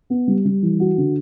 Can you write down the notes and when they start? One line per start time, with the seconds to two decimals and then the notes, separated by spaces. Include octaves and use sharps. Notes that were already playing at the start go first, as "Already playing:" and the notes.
0.10 B3
0.28 G3
0.45 G3
0.62 E3
0.80 F#4
0.98 D3